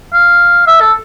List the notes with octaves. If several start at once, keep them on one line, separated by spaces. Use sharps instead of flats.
F5
E5
A4